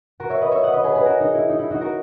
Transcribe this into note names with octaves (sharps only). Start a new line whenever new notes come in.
F#4 A#4
C#5 E5
B4 D#5
C#5 E5
D#5 F#5
B4 D#5
G#4 B4
G#4 B4
F#4 A#4
D#4
E4
D#4
E4
D#4 F#4
F#4 A#4